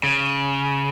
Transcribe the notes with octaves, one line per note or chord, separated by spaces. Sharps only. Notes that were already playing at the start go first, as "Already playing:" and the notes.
C#3